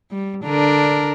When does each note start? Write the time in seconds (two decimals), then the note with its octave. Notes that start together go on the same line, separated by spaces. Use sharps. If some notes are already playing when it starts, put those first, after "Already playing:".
0.11 G3
0.44 D3 D4 A#4